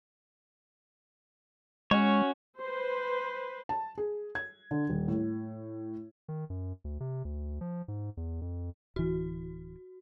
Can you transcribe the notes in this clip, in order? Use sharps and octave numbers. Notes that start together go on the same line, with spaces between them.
G#3 C#4 F#4 C#5
B4 C5
A5
G#4
G#6
D3
D#1
A2
D#3
F#2
D2
C3
D2
F3
G#2
E2
F2
D1 E3 F#4